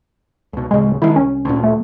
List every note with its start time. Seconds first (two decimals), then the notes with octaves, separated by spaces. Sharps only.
0.53 C#2 B2
0.71 D1 C#3 G#3
1.02 D#3 F3 G#3 E4
1.16 C2 C#4
1.45 D2 A#2
1.64 A3